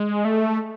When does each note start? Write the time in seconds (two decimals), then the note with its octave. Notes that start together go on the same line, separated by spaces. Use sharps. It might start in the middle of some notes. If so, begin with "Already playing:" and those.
Already playing: G#3
0.25 A3